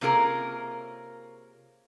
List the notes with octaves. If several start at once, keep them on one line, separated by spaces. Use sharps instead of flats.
C3 A#3 C#4 F4 G#4 A#4